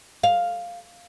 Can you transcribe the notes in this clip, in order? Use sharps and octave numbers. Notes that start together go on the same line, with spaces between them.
F5